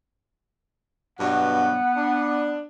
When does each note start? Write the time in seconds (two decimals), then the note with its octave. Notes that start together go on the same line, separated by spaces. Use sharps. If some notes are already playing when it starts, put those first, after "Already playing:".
1.20 G2 B2 F#3 B3 F#5
1.95 D4